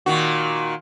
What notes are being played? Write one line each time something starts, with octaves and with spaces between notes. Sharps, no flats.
A#2 D#3 F#4